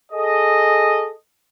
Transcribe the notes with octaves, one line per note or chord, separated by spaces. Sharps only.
G#4 A4 D#5